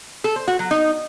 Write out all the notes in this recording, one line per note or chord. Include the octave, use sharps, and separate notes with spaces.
A4
C5
F#4
F#3
D#4